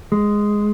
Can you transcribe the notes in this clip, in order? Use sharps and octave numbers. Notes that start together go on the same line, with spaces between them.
G#3